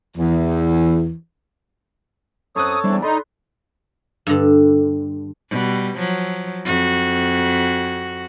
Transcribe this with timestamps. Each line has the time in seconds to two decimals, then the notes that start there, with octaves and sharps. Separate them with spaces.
0.17 E2 E3
2.56 F#2 C4 A4 C#5 D#6 F#6
2.84 E2 G3 C4 D4 E4
3.02 D#4 A4 D5 B5 C6
4.27 G2 D3
5.50 B2 G3
5.98 F3 F#3
6.65 F2 F#4